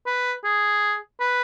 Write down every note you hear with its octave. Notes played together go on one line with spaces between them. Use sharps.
B4
G#4
B4